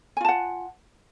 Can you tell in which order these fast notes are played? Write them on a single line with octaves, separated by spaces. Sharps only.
G#5 F4 A5 F#5